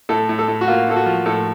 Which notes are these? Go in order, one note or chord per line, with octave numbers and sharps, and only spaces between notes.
A2 A4
A2
A4
A2
F#4
A#3 F4
A2 A4
F#4
F3
A2 A4